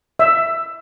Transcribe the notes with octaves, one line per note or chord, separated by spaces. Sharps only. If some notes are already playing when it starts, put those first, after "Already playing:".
E5